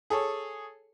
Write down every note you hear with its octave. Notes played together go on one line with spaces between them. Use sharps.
G#4 A4 C#5